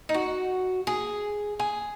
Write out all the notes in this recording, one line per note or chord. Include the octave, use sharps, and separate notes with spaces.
D#4
F#4
G#4
G#4